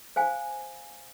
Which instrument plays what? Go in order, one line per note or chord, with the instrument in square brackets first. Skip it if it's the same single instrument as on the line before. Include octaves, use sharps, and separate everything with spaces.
[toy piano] C5 F5 G#5